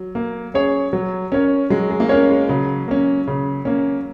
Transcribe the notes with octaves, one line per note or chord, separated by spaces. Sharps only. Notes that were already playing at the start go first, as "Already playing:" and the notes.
Already playing: F#3
A#3
C#4 G#4 C#5
F#3
C#4 A#4 C#5
F#3 G#3
G#3
A#3
G#3 C#4 A#4 C#5
G#3
C#3 F#3
A#3 C#4
C#3
A#3 C#4